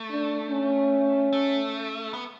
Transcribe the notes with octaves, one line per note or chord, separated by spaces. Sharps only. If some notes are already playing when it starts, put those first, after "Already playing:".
Already playing: A3
D4
C#4
A3
B3